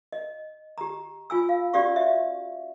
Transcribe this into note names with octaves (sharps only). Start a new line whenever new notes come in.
D#5
G4 A#5
F4 G#5 E6
F5
C#4 F#4 G4 D5 F5 C#6
E5